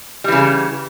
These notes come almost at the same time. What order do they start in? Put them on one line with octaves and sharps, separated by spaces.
G3 E3 C#3